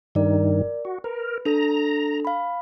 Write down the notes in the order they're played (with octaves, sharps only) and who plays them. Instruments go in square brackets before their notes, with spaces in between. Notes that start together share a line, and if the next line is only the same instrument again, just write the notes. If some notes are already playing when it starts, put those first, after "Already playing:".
[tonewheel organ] G2 D#3 [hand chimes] A#4 D5
[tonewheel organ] F#4
[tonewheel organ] A#4 [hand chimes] B4
[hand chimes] D4 A4 [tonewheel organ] A#5
[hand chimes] F5 B5